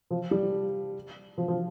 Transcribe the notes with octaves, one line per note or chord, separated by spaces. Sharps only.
F3
G3
F3
F3